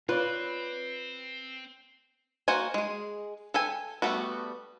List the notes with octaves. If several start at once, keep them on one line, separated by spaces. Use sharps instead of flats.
C4 F4 B4 C#5 D5
A#3 F#4 C5 F#5 G#5
G#3 G#4
A4 G5 G#5
G3 A3 B3 C4 F#4